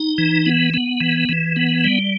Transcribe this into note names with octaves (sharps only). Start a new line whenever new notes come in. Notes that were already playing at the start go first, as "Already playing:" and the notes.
Already playing: D#4
E3
B3
B3
E3
E3
B3
G3